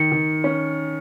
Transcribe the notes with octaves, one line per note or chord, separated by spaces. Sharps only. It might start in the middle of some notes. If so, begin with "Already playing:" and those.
Already playing: D#3 C#7
D#3
C#4